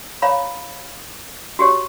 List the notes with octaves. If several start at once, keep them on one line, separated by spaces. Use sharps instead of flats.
C#5 F5 A#5 B5
F#4 G4 C#5